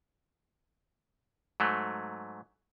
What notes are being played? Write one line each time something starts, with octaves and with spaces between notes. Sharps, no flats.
G#2 F#3 A3